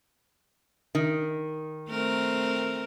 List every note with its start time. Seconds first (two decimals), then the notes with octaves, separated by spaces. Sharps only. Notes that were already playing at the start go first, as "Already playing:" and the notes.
0.95 D#3
1.89 A3 C4 A#4